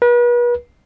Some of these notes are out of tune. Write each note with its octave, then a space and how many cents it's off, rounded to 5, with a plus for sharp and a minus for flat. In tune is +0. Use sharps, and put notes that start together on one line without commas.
B4 -40